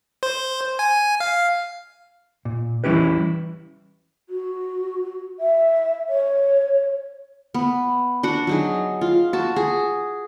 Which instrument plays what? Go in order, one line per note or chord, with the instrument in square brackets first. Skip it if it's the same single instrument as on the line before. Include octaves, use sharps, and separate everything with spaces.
[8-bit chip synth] C5
G#5
F5
[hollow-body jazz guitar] A#2
E3 G3 C#4 E4 G4 B4
[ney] F#4
E5
C#5
[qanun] B3
D4 F#4 F#5
F#3 D#4 G#4
F4
F#4 A5
G#4